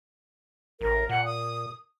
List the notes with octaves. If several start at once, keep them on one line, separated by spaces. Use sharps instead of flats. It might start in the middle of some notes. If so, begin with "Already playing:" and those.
A1 A#4
A#2 F#5
D#6